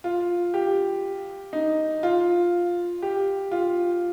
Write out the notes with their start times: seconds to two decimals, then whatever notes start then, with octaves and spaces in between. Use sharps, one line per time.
0.04 F4
0.54 G4
1.53 D#4
2.03 F4
3.02 G4
3.51 F4